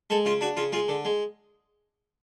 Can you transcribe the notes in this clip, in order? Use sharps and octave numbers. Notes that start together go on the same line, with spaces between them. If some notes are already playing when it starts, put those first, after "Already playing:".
G#3 A4
C#3 F4
D4 F#4
C#3 F4
G#3 F4
D3
G#3